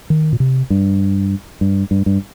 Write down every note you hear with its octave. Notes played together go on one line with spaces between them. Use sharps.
D#3
A#2
C3
G2
G2
G2
G2